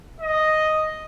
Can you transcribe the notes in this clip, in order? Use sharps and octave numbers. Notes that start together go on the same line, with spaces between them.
D#5